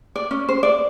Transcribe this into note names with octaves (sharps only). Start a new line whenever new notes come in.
D5
C#4
C5
D5